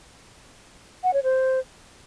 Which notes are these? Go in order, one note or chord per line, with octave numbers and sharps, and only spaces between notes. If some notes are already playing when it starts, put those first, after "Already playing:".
F#5
C#5
C5